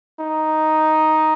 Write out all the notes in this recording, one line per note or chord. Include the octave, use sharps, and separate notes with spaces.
D#4